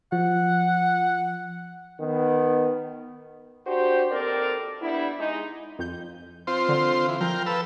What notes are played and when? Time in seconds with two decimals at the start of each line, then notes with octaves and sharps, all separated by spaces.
0.12 F3 F#5
2.01 D#3 B3
3.67 D4 F#4 G4 C5
4.11 D#2 C4 A4 A#4 D5
4.82 G3 B3 D4 E4
5.19 G#3 D#4
5.79 F2 G6
6.47 C4 F4 C5
6.69 D3
7.08 E3
7.21 F3 A#4 F5 G5
7.46 A4 B4 E6